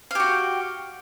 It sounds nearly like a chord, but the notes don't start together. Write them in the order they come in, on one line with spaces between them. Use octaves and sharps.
F5 G4 F#4